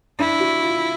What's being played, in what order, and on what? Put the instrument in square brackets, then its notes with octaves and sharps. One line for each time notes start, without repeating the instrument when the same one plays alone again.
[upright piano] D4 [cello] E4
[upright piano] F#4
F4